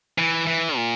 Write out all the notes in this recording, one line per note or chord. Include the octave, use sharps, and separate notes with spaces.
E3
E3
A#2